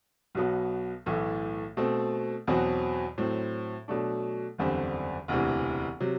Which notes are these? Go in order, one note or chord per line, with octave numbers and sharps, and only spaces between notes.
B1 B2 F#3 B3
B1 A2 E3 A3
B2 A3 C4
E2 B2 F#3 C4 F#4
A2 F#3 C4
B2 F#3 A3 D4
F#1 E2 D3 G3 C4
E1 D2 C3 E3
C3 F#3